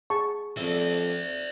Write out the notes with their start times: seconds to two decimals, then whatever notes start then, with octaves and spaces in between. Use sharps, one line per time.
0.10 G#4 A5 C#6
0.58 F2 D5 E5